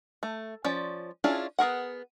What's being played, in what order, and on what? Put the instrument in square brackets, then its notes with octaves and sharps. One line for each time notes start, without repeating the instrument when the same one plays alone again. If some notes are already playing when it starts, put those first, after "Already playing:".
[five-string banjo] A3
F3 C#4 D5
C#4 D4 E4 F4 G#4
B3 G#4 A#4 F#5